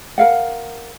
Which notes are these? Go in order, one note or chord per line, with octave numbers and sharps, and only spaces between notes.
A#4 F5 F#5